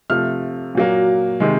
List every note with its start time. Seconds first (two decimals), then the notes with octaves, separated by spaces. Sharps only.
0.10 C3 F3 A3 F6
0.75 A#2 F#3 A#3
1.40 C3 D#3 G#3